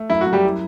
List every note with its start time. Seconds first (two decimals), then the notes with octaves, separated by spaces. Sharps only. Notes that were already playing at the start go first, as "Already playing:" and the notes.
Already playing: A3
0.10 F#2 E4
0.21 F#4
0.27 F#2
0.33 G3 G4
0.44 E4